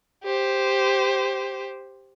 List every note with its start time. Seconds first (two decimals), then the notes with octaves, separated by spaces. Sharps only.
0.24 G4 C5